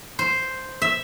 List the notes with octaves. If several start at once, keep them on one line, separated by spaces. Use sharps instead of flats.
C5
E5